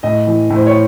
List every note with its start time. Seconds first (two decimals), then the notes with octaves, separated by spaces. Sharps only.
0.03 A2 D#5
0.27 E3
0.50 A2
0.56 C5
0.66 C#5